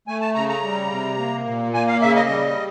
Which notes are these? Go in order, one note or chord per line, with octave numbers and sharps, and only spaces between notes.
A3 G#5
A5
C#3 A#5
A#5
G3
C3
A#3
A#2
A#3 G#5
F5
C#3 E5
D#5
G3